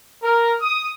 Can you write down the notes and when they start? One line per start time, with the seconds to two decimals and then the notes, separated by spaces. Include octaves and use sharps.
0.23 A#4
0.61 D#6